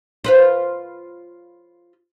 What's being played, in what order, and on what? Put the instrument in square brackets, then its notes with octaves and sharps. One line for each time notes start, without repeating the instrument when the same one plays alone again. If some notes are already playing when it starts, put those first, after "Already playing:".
[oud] F4 B4 C5